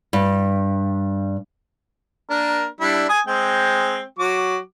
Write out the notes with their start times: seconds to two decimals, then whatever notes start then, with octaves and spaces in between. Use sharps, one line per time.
0.13 G2
2.30 A#3 D4 A#4
2.81 G3 D4 E4
3.09 G#5 D#6
3.27 G#3 C4 G5
4.19 F#3 F#4 D6